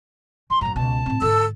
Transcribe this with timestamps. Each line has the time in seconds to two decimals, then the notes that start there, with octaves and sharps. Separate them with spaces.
0.50 E3 C6
0.61 F#2 A2 A#5
0.76 C#2 B2 A5
1.06 A2 C4
1.22 G#2 D3 A4 E6